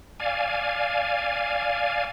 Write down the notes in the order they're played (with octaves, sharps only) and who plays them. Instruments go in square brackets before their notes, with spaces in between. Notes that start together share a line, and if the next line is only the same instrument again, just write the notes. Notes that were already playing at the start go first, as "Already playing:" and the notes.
[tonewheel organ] D5 F5 G#5